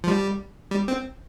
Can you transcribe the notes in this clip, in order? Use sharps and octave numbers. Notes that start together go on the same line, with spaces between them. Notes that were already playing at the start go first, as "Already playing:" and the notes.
F3
G3
G3
C4